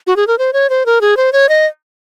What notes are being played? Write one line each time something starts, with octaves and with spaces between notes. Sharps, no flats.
F#4
G#4
A#4
C5
C#5
C5
A#4
G#4
C5
C#5
D#5